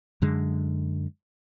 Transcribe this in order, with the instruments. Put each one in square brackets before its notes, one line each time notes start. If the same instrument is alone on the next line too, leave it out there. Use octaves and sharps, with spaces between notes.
[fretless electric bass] F#2 D3 G#3